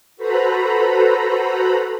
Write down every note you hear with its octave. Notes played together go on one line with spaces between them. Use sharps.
F#4 A4 B4 C5 A#5 B5